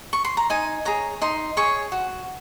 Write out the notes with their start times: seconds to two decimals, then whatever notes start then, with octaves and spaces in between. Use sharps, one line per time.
0.13 C#6
0.25 C6
0.37 A#5
0.50 D#4 G#5
0.85 G#4 C#5 A#5
1.21 D#4 C6
1.57 G#4 C#5 C#6
1.92 F#4